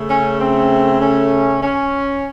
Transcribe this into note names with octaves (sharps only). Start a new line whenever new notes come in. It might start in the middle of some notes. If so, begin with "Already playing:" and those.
Already playing: C#3 A3
C#4
C4
C#4
C#4